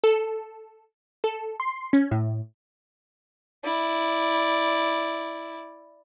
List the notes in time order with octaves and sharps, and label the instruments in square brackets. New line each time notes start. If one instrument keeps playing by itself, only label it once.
[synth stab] A4
A4
C6
C#4
A2
[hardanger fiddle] E4 D5